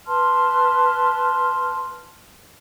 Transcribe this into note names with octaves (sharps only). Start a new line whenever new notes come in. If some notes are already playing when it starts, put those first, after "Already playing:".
B4 A5 C6 F6